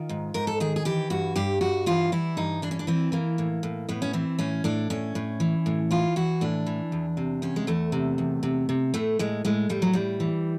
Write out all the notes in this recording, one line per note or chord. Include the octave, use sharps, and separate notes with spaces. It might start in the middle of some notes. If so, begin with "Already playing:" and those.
Already playing: D#3 F4
G#2
G#2 A#4
A4
D#3 G#4
G#4
E3 G4
G2 F#4
G2 G4
G2 F#4
E3 F4
E3 E4
G2 D#4
E3 D4
C#4
D4
E3 C4
E3 A#3
A2
A2
A2 B3
C#4
E3 C4
A2 C#4
A2 D4
A2 C#4
A2
E3
A2
E3 F4
E3 F#4
A2 D4
E3
E2
C3
E2 C#4
G#3
E2 A3
C3
E2
C3
C3
A2 A3
A2 G#3
A2 G#3
A2 G3
F#3
A2 G3
E3